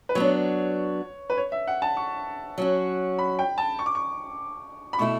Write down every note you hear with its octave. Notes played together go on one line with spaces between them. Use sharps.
B4
F#3 B3 D4 C#5
B4
C#5
E5
F#5
A5
C#6
F#3 C#4 F#4
B5
G5
A5
C#6
D6
C#6
B5
B2 A3 E4 C#6